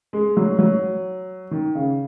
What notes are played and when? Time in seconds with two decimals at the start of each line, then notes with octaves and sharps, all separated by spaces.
0.13 G#3
0.37 F#3
0.59 F#3
1.51 D#3
1.75 C#3